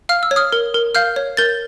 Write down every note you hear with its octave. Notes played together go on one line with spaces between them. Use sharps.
F5 F6
E6
C#5
D#6 F6
A#4
A#4
F5 F6 G6
C#5
A#4 G6 A6